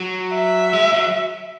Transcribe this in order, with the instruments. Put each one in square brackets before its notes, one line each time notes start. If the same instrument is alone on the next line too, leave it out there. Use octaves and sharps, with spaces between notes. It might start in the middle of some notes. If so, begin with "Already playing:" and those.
Already playing: [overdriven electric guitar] F#3
[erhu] E5
[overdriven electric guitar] G#3
F#3